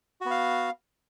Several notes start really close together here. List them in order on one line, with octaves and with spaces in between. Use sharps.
F#4 B3 F5